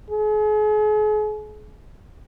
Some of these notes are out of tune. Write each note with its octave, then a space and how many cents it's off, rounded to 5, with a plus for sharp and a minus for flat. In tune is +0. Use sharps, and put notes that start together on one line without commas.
G#4 +40